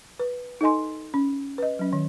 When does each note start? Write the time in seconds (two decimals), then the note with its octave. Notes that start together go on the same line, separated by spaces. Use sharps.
0.20 B4
0.61 D#4 A4 D#5 G#5 C6
1.14 C#4
1.58 B4 D#5
1.79 F#3 C#4
1.93 D#3